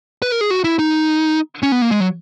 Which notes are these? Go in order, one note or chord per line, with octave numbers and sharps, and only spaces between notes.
B4
A#4
G#4
F#4
E4
D#4
C#4
B3
A#3
G#3
F#3